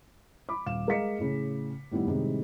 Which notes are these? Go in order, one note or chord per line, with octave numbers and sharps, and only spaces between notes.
B5 D6
D#1 F5 E7
G#3 A#4 D#5 F5 B6 C#7
A2 C#3
A2 D#3 G3 B3 E4
A2 C3 D#3 G3 G#3